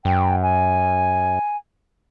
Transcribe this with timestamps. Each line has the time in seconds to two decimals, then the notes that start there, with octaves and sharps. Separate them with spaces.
0.05 F#2 G5
0.43 G#5